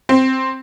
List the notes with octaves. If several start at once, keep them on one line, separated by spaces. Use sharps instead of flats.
C4